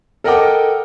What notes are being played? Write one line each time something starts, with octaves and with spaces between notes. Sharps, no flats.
A4 A#4 D#5 F#5 G5 D6